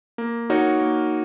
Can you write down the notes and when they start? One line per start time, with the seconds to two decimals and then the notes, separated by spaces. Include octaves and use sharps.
0.18 A#3
0.50 D#4 F#4 A#4 C#5
0.81 A#3